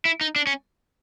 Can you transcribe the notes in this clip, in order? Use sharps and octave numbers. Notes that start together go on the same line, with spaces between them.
E4
D#4
D4
C#4